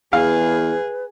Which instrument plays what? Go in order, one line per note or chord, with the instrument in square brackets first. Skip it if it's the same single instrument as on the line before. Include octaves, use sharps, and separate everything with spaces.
[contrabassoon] E2 [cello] G#4 [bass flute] B4 [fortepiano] F5